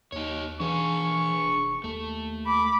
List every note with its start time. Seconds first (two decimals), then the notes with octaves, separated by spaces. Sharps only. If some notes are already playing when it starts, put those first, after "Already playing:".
0.12 D#2 D#4 C#5
0.60 E3 D4 G#4 C#6
1.44 F1
1.84 D#2 A3
2.46 B5 D6